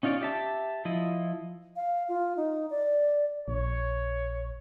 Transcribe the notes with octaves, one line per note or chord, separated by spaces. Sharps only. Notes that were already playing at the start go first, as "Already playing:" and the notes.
C#4 D#4 F4 C#5 D5
G4 E5 A5
F3 E4 D#5
F5
F4
D#4
D5
A#1 C#5